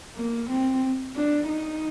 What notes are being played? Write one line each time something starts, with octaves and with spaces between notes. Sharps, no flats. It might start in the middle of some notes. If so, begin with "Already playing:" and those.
A#3
C4
D4
D#4